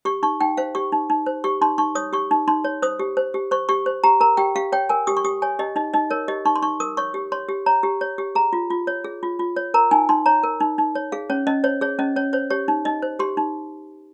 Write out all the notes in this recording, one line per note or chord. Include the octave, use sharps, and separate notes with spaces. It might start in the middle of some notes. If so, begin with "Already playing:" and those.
G4 C#6
D#4 C#6
D#4 G5
C5 F5
G4 C#6
D#4
D#4
C5
G4 C#6
D#4 C6
D#4 C#6
C#5 D#6
G4 C#6
D#4
D#4 C6
C#5
C5 D#6
G4
C5
G4
C5 C#6
G4 C#6
C5
G4 A#5
A#4 A#5
G4 G5
G4 F5
C#5 G5
A#4 G#5
G4 D#6
C#6
G4 D#6
C#5 G#5
G4 D#5
D#4 D#5
D#4 D#5
A#4 C#5
G4 D#5
D#4 C#6
C6
D#4 C#6
A#4 D#6
C#5 C#6
G4
C#5 C6
G4
C#5 A#5
G4
C#5
G4
G#4 A#5
F4
F4
C#5
G#4
F4
F4
C#5
A#4 A#5
D#4 G#5
D#4 C6
C#5 A#5
A#4
D#4
D#4
C#5
G#4 F5
C#4 C#5
C#4 D#5
C5 C#5
G#4 C#5
C#4 D#5
C#4 C#5
C5 C#5
G4 C#5
D#4
D#4 D#5
C5
G4 C6
D#4